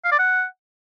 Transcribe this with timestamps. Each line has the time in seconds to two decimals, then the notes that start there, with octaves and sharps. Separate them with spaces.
0.05 F5
0.12 D5
0.19 F#5